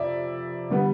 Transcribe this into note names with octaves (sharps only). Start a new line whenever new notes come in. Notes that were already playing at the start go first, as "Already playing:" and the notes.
Already playing: F2 C3 F3 D5 E5
D3 G3 B3